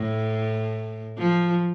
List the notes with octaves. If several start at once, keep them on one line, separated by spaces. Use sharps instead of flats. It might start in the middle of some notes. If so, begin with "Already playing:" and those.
Already playing: A2
F3